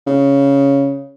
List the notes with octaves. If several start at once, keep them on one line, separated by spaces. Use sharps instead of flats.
C#3